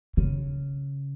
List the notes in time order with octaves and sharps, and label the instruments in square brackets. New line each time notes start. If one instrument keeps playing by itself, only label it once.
[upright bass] C#3